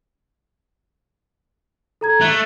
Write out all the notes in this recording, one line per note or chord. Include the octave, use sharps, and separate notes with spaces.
A4 A#5 G#6
A3 F#6